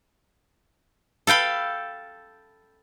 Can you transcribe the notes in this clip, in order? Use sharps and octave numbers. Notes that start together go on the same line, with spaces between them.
A4 F5 G5 B5